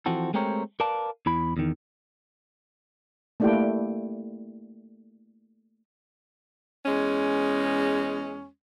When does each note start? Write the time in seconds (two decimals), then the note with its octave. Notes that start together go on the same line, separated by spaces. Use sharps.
0.06 E3 F3 C4 F#4 A4
0.34 G#3 A3 C4 G4 A#4 C#5
0.80 A#4 B4 D5 F5 A5
1.26 E2 E4 B5
1.57 E2 D#3
3.40 A3 A#3 D4 E4 G4 G5
6.86 E2 G#3 C#4